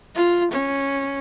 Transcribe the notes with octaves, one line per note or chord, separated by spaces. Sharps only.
F4
C#4